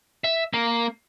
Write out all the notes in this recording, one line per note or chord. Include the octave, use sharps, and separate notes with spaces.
E5
A#3